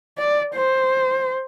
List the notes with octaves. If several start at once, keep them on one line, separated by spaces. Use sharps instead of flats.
D5
C5